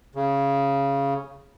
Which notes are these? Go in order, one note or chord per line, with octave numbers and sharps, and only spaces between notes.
C#3